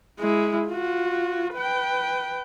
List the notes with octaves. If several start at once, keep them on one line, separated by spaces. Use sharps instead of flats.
G#3 E4
F4 F#4
B4 G5